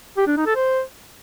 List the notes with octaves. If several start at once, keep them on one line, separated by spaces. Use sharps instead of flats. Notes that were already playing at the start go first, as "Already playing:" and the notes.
G4
D4
D#4
A4
C5